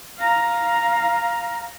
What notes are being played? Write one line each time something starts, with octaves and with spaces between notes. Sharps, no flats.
F5 A#5